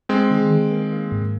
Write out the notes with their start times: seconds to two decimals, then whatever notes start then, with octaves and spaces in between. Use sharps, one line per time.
0.09 G#3 C4 G#4
0.31 D#3
0.50 D#3
0.71 A#3
0.92 A#3
1.12 G#2